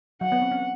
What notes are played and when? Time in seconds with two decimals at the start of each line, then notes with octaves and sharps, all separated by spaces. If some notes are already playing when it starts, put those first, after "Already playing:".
0.21 F#3 F#5
0.32 B3
0.42 C4
0.51 C#4